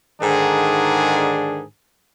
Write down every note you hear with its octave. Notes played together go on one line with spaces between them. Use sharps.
G#2 D3 D#3 D4 G#4